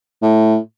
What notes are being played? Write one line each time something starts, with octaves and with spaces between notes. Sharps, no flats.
A2